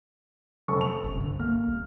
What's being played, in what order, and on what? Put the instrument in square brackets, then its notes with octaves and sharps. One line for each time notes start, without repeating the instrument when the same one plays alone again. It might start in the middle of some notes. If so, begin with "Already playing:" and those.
[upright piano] F1 A4 C#6
F7
[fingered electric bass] F#1 C2
G2 D3
[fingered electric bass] A#3 [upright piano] F6
[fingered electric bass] C2